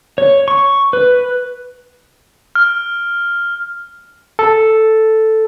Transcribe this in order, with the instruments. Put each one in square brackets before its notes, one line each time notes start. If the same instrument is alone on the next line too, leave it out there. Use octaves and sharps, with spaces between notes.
[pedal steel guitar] C#5
C#6
B4
[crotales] F6
[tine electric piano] A4